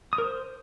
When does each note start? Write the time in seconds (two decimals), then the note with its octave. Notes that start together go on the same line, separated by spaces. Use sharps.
0.13 D#6
0.18 A#4
0.24 C5